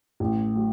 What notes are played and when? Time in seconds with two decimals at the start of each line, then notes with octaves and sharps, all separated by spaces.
0.20 A1
0.54 A2 F#3